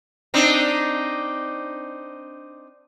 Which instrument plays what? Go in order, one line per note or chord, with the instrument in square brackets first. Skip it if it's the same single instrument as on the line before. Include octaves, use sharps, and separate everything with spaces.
[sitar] C4 D4 D#4